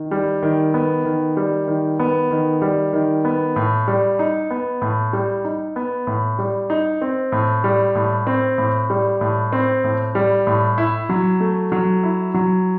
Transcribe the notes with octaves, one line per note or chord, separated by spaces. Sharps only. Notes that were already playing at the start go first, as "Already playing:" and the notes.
Already playing: D#3
G3
D#3
B3
D#3
G3
D#3
B3
D#3
G3
D#3
B3
A2
G3
D#4
B3
A2
G3
D#4
B3
A2
G3
D#4
C4
A2
G3
A2
C4
A2
G3
A2
C4
A2
G3
A2
E4
F#3
A3
F#3
E4
F#3